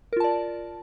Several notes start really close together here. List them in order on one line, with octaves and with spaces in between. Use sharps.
A#4 F4 A5 D5